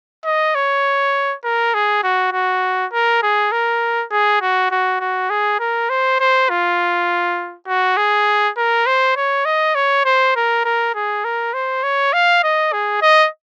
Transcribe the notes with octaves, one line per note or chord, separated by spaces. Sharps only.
D#5
C#5
A#4
G#4
F#4
F#4
A#4
G#4
A#4
G#4
F#4
F#4
F#4
G#4
A#4
C5
C5
F4
F#4
G#4
A#4
C5
C#5
D#5
C#5
C5
A#4
A#4
G#4
A#4
C5
C#5
F5
D#5
G#4
D#5